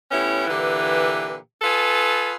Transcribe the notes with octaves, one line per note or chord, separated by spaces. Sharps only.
A2 B3 C#4 E4 G4
A#2 D3 E3 G4 B4
F4 G#4 A4 B4